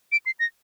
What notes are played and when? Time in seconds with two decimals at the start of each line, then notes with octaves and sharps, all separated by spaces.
0.12 D7
0.26 C7
0.39 A#6